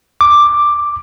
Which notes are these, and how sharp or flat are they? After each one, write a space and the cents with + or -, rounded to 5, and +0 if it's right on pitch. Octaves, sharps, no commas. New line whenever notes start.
D6 +5